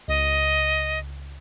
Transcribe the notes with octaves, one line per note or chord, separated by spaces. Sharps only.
C#2 D#5